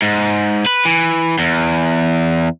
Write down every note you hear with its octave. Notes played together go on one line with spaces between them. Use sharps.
G#2
B4
E3
E2